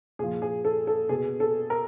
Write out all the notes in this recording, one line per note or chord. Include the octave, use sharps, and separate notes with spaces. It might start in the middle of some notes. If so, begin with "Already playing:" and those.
A#2 F3 G#4
G#4
A4
A4
B2 G#4
A4
A#4